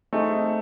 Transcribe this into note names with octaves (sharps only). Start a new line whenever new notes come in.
A3 C4 D#4 G#4